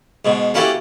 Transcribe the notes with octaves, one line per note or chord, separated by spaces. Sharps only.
G#2 B2
A#3 C#4 E4 F#4 G4 A4